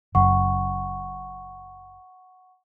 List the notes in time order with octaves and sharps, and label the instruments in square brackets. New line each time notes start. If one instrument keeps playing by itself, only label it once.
[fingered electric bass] F#1 F#2 [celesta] F#5 C#6